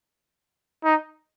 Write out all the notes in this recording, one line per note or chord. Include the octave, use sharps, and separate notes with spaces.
D#4